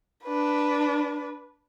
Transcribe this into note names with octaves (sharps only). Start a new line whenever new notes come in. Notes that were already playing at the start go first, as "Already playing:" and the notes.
D4 B4